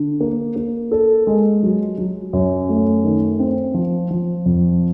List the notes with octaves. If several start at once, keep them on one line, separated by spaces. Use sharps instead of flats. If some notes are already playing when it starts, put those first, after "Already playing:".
Already playing: D3
A#3
A#3
A4
G#3
F#3
F#3
F#2
A3
D#3
C4
F3
F3
F2